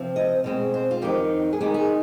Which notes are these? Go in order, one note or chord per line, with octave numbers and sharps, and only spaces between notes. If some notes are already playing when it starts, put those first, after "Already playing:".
Already playing: C3 F3 C4
D#5
B2 G#3 C4
C5
F4
F2 D#3 B3 D#4 G4
G#4
D#3 G#3 B3 D#4 G4
G#4